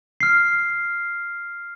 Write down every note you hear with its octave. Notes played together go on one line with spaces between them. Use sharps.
F6 C7